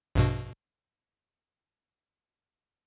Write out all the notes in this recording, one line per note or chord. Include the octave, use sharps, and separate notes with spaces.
A#1 G2 B2